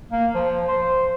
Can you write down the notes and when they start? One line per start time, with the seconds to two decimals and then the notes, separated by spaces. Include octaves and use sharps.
0.11 A#3
0.35 F3
0.68 C5